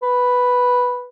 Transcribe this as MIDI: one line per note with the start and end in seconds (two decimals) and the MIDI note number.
0.03 1.07 71